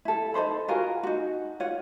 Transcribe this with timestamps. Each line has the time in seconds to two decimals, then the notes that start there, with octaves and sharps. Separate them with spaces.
0.05 E4 A4
0.34 D#4 A4 C5 B5
0.68 F4 F#4 G#4 A#4
1.03 D#4 F#4
1.60 F4 C#5 F#5